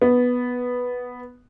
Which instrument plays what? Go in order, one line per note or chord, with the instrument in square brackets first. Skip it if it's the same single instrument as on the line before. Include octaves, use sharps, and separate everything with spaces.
[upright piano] B3